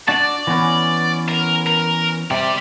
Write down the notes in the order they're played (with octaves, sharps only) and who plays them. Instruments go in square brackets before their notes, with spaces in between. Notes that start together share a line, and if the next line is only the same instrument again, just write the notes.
[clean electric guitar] D4 F#4 A5 [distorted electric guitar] D5
[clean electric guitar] E3 B3 C#4
[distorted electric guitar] A#4
A#4
[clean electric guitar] C3 [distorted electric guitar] G4 D5